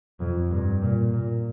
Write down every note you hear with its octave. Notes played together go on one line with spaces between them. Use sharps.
F2
G2
A#2
A#2